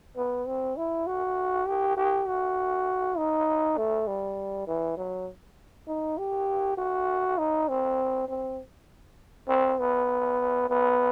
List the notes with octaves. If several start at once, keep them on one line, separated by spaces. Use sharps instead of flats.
B3
C4
E4
F#4
G4
G4
F#4
D#4
A3
G3
E3
F#3
D#4
G4
F#4
D#4
C4
C4
C4
B3
B3